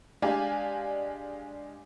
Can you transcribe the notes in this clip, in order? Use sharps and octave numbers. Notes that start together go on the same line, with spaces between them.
G#3 D4 G4 D5 F5 G#5